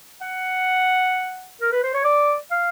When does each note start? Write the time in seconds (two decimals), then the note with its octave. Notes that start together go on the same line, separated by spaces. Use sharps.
0.21 F#5
1.62 A#4
1.72 B4
1.83 C5
1.94 C#5
2.04 D5
2.51 F5